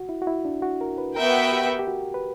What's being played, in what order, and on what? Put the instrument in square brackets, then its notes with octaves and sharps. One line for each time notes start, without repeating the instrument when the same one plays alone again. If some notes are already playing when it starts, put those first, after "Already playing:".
Already playing: [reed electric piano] F#4
E4
F#4
E4
D4
F#4
A#4
B4
[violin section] B3 F#4 B4 E5 G5 [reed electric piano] A#4
[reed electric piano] G4
G4
F#4
B4